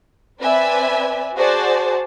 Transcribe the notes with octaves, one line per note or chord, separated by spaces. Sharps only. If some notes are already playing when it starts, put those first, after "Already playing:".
C4 B4 D5 E5 G#5
F#4 G#4 C5 D5 A5